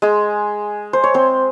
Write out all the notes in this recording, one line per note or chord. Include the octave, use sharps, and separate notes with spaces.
G#3 G#4
C5
C#5
C4 C5